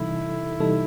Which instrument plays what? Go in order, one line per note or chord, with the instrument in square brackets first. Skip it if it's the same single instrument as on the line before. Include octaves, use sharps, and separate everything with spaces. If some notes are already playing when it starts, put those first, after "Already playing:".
Already playing: [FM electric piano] C3 E3 G3 D#4 A4 [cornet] E4
[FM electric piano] C3 E3 G3 D#4 A4